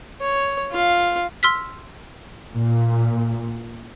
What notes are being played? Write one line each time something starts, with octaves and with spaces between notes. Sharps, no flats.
C#5
F4 F5
C6 E6 F6 B6
A#2